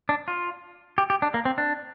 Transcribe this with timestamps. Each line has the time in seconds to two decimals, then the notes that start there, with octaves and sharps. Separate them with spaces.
0.09 D4
0.28 F4
0.98 G4
1.10 G4
1.22 D4
1.34 A#3
1.45 C4
1.58 D4